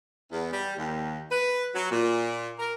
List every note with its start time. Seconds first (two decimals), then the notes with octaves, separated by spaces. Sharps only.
0.32 E2
0.53 G3
0.77 D#2
1.31 B4
1.75 F#3
1.91 A#2
2.59 A#4